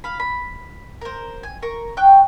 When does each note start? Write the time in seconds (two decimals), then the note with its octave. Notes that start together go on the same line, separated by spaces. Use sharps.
0.04 F5 B5
0.20 B5
1.01 A#4 C5
1.43 G#5
1.62 A#4 C#6
1.97 G5 C#6 F#6 G6